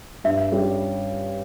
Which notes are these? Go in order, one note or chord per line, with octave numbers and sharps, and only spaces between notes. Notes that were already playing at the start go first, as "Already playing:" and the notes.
G2 E5
G3 C#4 G4